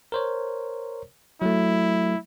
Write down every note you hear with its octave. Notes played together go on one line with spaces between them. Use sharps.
A#4 C5 C#5
F#3 A3 E4